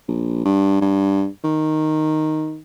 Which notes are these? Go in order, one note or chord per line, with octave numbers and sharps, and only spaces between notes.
A#1
G2
G2
D#3